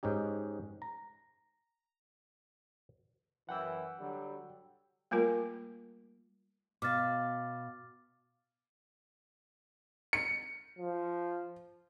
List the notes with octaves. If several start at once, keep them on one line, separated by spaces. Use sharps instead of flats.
G#2 C#4 D#4 G4
A#5
F#2 E3 F#5 G5 E6
D3 F#3 G3
G3 A3 A#3 F4 A#4
B2 F5 D6 F6 A6
C#7
F3